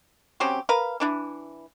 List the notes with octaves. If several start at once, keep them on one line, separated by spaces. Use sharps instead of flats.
F#3 C4 C#4 G4
A#4 B4 F5
E3 D4 E4